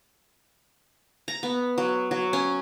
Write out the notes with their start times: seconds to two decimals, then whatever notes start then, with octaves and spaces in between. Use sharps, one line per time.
1.28 A#5
1.43 B3
1.78 F#3
2.11 F#3
2.33 C#4